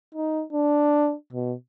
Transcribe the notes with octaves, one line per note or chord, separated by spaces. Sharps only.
D#4
D4
B2